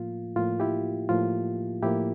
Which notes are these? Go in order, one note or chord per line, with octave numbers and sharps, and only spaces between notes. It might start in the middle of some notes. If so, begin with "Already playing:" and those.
Already playing: A2 F3 A#3 F4
A2 F3 A#3 F4
E4 G4
A2 F3 A#3 F4
A2 F3 A#3 E4 G4